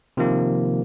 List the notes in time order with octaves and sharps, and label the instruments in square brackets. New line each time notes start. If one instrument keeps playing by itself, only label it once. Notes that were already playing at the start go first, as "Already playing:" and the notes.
[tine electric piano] C3 D#3 F3 A#3